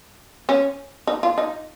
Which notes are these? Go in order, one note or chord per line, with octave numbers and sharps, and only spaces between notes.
C#4
D#4
F4
D#4